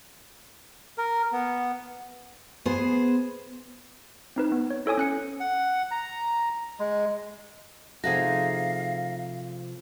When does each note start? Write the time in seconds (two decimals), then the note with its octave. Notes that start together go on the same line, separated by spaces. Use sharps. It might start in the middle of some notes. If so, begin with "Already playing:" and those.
0.98 A#4
1.32 B3
2.66 B3 G#4 C5
4.36 C4 D#4 B4
4.52 B3
4.70 C#5
4.86 E4 A4 C#5 G#5 D#6
4.97 C#4 F#6 C#7
5.40 F#5
5.91 A#5
6.79 G#3
8.04 C3 F3 A3 D#4 F#4 G#4 F5 A#6